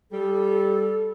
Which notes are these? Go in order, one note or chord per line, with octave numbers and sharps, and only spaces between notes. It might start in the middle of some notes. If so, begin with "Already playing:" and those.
G3 A4